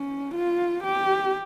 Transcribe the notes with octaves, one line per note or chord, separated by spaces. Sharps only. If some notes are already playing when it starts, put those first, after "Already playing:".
Already playing: C#4
F4
G4